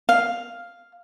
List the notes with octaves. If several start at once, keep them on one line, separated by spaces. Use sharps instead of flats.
F5